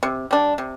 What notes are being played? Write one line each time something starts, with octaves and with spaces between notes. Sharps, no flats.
C3
G3 D4
C3